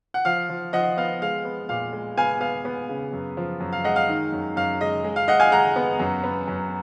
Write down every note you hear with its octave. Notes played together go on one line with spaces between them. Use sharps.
F#5
F3 F5
F3
F3 D#5 F#5
B3 F5
G#3 F5
B3
A#2 F5
G#3
B3 F5 G#5
B3 F5
B3
C#3
F#2
F3
F#2
F5
G#3 D#5 F#5
F5
D#3
F#2
F#2 F5
G#3 D#5
G#3
F5
G#3 D#5 F#5
F5 G#5
G#3 F#5 A#5
B3
F#2
B3
F#2